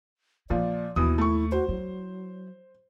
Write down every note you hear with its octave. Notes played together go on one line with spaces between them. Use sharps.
A#2 F3 A#3 D5
D#2 B2 E3 E4 D#6
A3 C#6
F#4 C5
F#3 E4